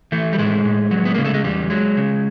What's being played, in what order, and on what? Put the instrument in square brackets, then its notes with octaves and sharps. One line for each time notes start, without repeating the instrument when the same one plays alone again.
[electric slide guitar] E3 A3
G3
A2 G#3
A2
F#3
B3
C#3 A#3
A3
G#3
E2 G3
F#3 G#3
C#3